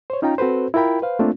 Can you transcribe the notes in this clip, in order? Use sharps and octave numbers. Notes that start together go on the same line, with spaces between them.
C5 C#5
C#4 D#4 F4 G5 A#5
C4 F#4 A4 B4 C5
E4 F4 A#4 G5 B5
B4 C5 F5
A3 A#3 C4 D4 F4